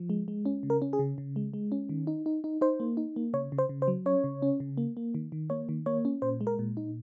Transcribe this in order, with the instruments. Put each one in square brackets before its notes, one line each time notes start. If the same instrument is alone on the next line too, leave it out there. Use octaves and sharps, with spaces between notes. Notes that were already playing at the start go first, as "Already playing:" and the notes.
Already playing: [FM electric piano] F3
G#3
G#3
C#4
C#3
A#4
C#4
G#4
C#3
C#3
G#3
G#3
C#4
D#3
D#4
D#4
D#4
D#4 C5
A#3
D#4
A#3
C#3 C#5
C#3
C5
C#3
C5
F#3
C#4 C#5
C#3
C#4
C#3
A#3
A#3
D#3
D#3
A#3 C#5
D#3
A#3 C#5
C#4
A#2 C5
G#3
A#4
A#2
D#4